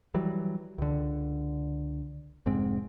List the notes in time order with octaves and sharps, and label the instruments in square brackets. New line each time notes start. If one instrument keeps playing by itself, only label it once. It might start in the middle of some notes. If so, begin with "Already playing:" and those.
[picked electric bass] E3 F#3 G3
C#2 D3
F1 G#2 G#3 C4